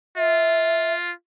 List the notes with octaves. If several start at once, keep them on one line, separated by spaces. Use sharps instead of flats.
F4 E5